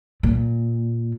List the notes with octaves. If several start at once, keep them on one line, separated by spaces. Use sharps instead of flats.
A#2